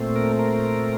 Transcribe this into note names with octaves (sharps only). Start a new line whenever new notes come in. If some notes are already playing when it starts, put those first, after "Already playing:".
Already playing: A#2 A3 C4
A#4
A#4